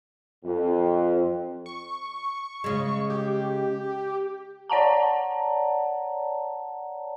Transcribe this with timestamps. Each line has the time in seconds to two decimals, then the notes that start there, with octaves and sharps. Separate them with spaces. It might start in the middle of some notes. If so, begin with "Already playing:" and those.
0.44 F2
1.66 C#6
2.64 C#3 G#3
3.10 G4
4.70 C#5 D5 F#5 A5 A#5